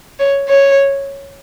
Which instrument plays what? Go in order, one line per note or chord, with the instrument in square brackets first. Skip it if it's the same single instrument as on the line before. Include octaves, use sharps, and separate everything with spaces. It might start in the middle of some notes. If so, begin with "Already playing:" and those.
[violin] C#5
C#5